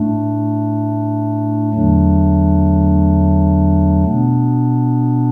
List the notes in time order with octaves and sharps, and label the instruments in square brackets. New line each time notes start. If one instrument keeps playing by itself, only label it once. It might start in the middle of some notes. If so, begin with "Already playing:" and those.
Already playing: [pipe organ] A2 A3 D4
E2 D3 F#3 A3 D4
B2 B3 D4